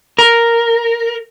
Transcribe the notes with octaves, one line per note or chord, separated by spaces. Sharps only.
A#4